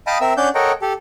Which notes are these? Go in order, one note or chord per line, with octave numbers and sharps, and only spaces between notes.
D#5 F5 G5 A5 B5 D#6
C4 A#4 E5 E6
C#4 D4 D5 F#5 G6
A4 A#4 C#5 D#5 F#5 G5
G4 A4